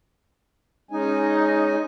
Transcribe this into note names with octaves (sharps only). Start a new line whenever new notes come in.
G#3 C#4 D#4 G#5